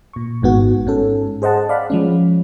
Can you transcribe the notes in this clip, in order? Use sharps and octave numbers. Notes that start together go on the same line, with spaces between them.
A#2 C#6
G#1 G#2 B3 F#4
G#2 C#4 A4
G#4 C5 D#5 F#5 A5
D5 F5 F#5 B5
F3 G#3 C#4